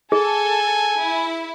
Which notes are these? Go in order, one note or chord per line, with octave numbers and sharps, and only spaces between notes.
G#4 A4 G#5
E4